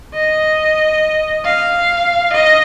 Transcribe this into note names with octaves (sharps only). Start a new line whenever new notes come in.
D#5
F5
D#5